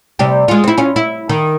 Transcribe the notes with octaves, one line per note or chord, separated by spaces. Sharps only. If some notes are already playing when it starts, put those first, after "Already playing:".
C3 G3 G4
G#3 F4
C4 E4
C#4 F4
E4
D#3